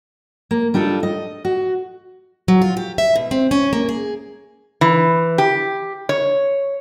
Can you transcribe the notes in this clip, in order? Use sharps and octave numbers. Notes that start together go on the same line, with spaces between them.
A#3
G3 D4 D#4 F4 A4
D#5
F#4
F#3
F4
G4
E5
B2
C4
C#4
A#3
G#4
E3
G4
C#5